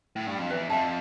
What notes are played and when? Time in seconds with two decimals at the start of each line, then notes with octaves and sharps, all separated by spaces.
0.16 A2
0.27 G2
0.38 F2
0.50 E2 B4
0.69 F2 E5 A5